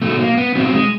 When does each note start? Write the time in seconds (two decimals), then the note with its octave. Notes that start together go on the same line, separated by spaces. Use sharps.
0.02 B2 F#3 A3
0.19 A#3
0.37 B3
0.55 B2 F#3 C4
0.73 G#3